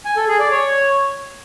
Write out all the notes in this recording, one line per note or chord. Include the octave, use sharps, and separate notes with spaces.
G#5
A4
G#4
D5
C#5